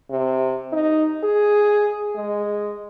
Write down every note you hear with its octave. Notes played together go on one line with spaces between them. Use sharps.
C3
D#4
G#4
G#3